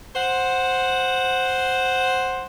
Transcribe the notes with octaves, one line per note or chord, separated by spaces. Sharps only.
C5 F#5